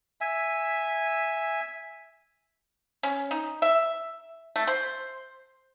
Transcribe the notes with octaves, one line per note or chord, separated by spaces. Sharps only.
E5 G#5
C#4
D#4
E5
A3
C5